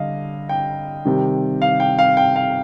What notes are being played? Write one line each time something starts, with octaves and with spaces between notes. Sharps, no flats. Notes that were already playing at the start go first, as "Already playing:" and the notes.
Already playing: D3 G3 D#5 F5
G5
C3 D#3 G3
F5
G5
F5
G5
F5